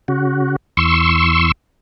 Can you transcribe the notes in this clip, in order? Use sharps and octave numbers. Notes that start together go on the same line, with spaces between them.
C#3 F#4
E2 C6 C#6 E6